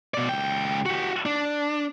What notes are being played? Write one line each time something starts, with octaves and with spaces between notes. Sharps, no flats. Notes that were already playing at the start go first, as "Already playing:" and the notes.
B2 D5
C#2 G5
F#4 G4
D4